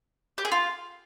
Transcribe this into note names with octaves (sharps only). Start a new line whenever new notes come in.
G4
G#4
F4